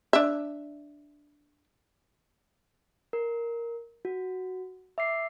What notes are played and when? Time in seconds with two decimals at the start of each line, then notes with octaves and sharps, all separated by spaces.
0.13 D4 E5
3.13 A#4
4.05 F#4
4.98 E5 D6 C7